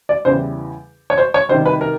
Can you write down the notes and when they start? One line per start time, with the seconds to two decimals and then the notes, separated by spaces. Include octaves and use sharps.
0.09 D5
0.25 E2 C#3 E3 G3 C5
1.10 C#5
1.18 C5
1.34 C#5
1.49 C3 D#3 G3 C5
1.66 B4
1.81 A#4